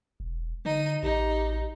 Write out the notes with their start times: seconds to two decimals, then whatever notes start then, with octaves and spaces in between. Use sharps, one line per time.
0.20 E1
0.65 D3 D#4 D#7
1.03 A1 D#4 G4